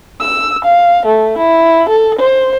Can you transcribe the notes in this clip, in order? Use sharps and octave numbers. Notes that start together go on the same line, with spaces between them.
E6
F5
A3
E4
A4
C5